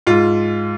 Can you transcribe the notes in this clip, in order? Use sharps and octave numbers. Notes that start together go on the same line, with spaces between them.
G#2 F4